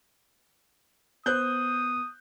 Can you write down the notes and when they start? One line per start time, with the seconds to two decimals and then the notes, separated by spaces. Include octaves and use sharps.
1.26 B3 C5 D#6 F#6 G6